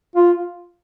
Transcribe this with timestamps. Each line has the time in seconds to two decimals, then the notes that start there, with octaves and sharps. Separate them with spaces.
0.16 F4